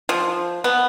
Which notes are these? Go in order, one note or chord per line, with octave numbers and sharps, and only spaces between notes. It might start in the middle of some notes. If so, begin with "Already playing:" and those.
F3
B3